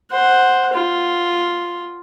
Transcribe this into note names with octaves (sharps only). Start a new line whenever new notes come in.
C5 F#5
F4